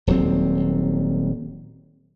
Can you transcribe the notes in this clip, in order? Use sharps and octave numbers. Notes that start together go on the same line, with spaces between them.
D#1 D#2 F#3 C4